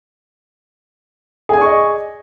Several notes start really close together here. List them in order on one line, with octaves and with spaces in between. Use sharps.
G#4 G#5 D5 C#6 D#5